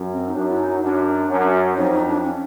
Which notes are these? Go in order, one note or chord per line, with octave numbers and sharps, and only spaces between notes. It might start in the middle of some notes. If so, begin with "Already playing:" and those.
Already playing: F#2
C4
D#4
F#2 D4
E4
D#4
F#2 D4
F#2
F2 D#4
D#4
D4
C#4